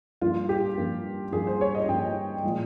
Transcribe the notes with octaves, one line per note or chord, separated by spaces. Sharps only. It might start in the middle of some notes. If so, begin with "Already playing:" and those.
G2 F3 A#3 F4
G4
G2 F3 A#3
G2 F3 A#3 G#4
C5
C#5
D#5
G2 F3 A#3 G5
A#2 F3 G#3